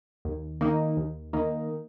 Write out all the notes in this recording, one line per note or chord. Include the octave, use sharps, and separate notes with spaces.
D#2
D#3 A#3 D#4
D#2
D#3 A#3 D#4